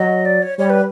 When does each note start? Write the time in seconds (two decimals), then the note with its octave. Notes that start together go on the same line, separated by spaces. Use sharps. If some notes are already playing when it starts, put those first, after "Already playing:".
Already playing: F#3 D#5
0.25 D5
0.42 C#5
0.58 G3 C#5
0.70 B4